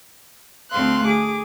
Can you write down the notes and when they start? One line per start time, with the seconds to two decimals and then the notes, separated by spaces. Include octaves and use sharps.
0.71 D2 A3 C4 F5 C6 F#6
1.05 G#4 D6